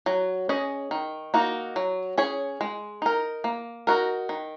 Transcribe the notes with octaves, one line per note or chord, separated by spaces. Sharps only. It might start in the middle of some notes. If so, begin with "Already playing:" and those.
F#3
C#4 G#4 D#5
D#3
A#3 D#4 F#4
F#3
C#4 G#4 C#5
G#3
D#4 A#4
A#3
D#4 F#4 A#4
D#3